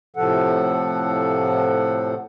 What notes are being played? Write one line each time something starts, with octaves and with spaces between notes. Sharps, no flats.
A2 C3 F3 A4 F#5